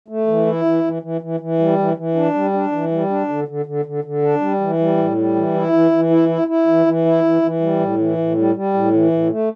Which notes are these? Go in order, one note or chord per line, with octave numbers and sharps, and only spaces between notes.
A3
E3
E4
E3
E3
E3
E3
E3
G3
E3
E3
D4
G3
D4
E3
G3
D4
D3
D3
D3
D3
D3
D4
G3
E3
G3
A2
G3
E3
E4
E3
E3
E4
E4
E4
E3
E3
E4
E3
E3
G3
A2
E3
A2
G3
G3
A2
E3
A2
A3